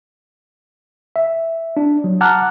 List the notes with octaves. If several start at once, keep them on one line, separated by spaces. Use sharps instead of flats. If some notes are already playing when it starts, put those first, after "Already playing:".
E5
D4
F#3
F#5 A5 A#5 D6 F6 F#6